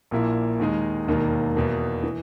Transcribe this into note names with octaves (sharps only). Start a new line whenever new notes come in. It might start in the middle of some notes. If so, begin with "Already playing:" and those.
A#1 A#2 A#3 E4
D#2 D#3 G#3 D#4
E1 D#2 D#3 A#3
E2 B2 A#3
E3